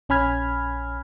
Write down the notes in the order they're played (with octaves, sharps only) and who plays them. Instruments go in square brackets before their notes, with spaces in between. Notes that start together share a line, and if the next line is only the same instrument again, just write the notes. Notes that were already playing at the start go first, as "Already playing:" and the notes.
[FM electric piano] A#1 C#4 G#5 B5 F6 G#6